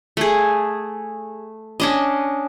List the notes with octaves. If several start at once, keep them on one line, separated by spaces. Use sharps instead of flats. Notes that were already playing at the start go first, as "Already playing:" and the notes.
A3 G#4
C#4 D4 D#5